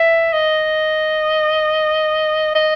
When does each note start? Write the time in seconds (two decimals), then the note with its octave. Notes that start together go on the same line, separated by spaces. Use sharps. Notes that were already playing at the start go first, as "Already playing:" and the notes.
Already playing: E5
0.33 D#5
2.55 D#5